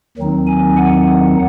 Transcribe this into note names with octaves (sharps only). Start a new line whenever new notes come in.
D#2 D#3 F#3 C4 D#4
G#5
F#5